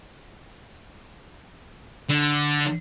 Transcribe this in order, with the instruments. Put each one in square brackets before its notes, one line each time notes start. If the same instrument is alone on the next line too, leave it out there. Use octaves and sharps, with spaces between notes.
[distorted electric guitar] D3